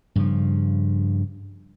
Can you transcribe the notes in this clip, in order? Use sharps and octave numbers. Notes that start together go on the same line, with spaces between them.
G2 C#3 F3